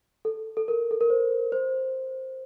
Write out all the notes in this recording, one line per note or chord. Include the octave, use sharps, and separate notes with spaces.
A4
A4
A#4
A4
A#4
C5
C5